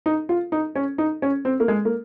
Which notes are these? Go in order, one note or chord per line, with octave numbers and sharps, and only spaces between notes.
D#4
F4
D#4
C#4
D#4
C#4
C4
A#3
G#3
A#3